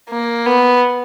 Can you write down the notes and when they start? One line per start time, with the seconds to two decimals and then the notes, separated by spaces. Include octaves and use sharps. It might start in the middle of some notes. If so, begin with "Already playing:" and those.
0.10 A#3
0.46 B3